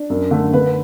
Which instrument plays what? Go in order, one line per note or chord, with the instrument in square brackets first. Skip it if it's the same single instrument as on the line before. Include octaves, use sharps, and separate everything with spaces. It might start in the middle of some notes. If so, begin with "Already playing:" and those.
Already playing: [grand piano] D4
[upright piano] F#2
D3 A3
[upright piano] D3 [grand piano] B4